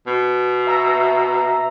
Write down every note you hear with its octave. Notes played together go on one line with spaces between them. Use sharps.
B2
E5 A#5